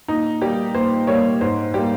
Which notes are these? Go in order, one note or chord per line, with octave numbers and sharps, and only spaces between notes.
A#2 D#4
G3 A#3 G4
A#2 C5
G3 A#3 C#5
G#2 C5
G3 A#3 G4